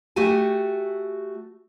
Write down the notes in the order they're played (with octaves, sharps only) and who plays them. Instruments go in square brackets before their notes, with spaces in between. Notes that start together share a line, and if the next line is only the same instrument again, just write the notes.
[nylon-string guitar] A3 F#4 G4 G#5